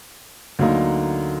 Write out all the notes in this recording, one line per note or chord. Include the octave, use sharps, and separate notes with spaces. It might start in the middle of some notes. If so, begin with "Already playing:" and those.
D2 D3 F#3 A#3 D#4